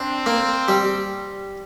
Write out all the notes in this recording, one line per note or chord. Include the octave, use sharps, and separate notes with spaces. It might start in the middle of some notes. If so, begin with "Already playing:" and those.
Already playing: C4 D4
A#3
G3